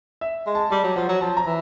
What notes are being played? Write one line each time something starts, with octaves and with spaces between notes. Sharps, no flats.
E5
G#3
A5
G3 A5
F#3
F3 F#5
F#3
F3 A5
A#5
E3